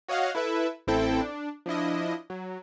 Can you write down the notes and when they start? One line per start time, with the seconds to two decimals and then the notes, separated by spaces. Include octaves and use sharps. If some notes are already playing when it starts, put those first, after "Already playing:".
0.08 F#4 C#5 D#5 F5 F#5
0.35 E4 A4 B4 E5
0.87 A1 C4 E4 A4 G5
1.21 D4
1.66 F3 D4 E4 D#5
2.30 F#3